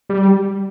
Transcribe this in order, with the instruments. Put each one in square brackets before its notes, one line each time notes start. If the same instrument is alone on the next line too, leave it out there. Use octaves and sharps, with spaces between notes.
[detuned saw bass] G3